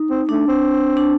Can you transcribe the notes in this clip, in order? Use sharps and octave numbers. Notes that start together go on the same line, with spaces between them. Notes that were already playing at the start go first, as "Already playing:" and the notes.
Already playing: D#4
C4
A3 D4
C4
D4